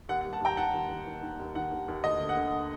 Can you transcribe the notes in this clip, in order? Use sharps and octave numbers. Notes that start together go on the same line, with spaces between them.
D#2 F#5
F#5
G3
F#5 A5
D#2 G5 A#5
D#3 F#5 A5
D#2
D#3
D#3
D#3
D#2
D#3 F#5
D#2
D#2
D2 D#5
D3
F#5
D3